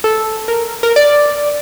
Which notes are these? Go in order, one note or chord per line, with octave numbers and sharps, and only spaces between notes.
A4
A#4
A#4
D5